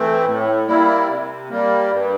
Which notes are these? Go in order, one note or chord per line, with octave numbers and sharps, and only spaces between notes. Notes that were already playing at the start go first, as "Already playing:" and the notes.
Already playing: E3 A3 C4
A2
G3 A#3 E4
C3
G3 A#3
G2